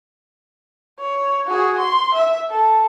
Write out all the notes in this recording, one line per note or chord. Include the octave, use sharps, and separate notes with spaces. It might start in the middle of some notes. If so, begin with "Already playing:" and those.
C#5
F#4 G#4
C6
E5
A4